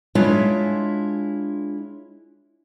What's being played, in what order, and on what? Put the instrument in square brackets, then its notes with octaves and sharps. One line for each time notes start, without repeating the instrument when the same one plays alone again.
[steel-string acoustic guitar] G#3 D4 E4 F4 C#5 E5